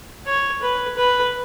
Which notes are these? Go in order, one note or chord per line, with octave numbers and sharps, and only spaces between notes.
C#5
B4
B4